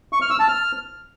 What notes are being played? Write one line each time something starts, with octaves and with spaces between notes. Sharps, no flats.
C#6
F6
E6
A5
F6